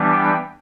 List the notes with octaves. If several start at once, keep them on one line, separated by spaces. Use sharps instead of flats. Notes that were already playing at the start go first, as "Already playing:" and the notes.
Already playing: E3 G3 B3 D4
G5